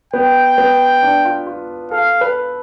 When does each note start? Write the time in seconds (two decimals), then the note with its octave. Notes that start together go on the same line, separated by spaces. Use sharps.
0.13 B3 G5
0.58 B3
1.03 D4
1.25 F4
1.47 F4
1.91 A4 F5
2.21 B4